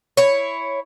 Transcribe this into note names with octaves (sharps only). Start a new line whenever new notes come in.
E4 C#5